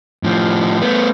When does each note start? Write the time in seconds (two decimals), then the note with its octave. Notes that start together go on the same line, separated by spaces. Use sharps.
0.23 A2 F3
0.81 A3 B3